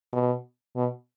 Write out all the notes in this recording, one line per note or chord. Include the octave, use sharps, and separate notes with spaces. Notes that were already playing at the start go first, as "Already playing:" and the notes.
B2
B2